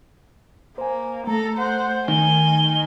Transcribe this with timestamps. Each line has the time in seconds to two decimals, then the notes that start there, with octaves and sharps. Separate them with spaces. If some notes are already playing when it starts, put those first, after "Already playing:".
0.78 A#3 C5 G#5
1.27 A3 A4 A#5
1.57 C5 F#5
2.08 D#3 G#5 G7